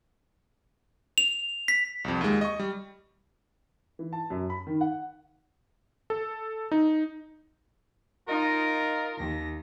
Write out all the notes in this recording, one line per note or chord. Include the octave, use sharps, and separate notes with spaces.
F7
B6
C2 F2
D#2 G#3
D#5 C#6
G3
E3
A5
F#2
B5
D#3
F#5
A4
D#4
D#4 F4 A#4 D#5
D#2 A#6